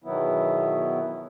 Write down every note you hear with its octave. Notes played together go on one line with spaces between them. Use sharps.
E2 B2 D#3 F#3 B3 E4